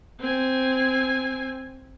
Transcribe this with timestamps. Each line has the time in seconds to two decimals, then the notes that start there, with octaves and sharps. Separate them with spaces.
0.20 C4 G#5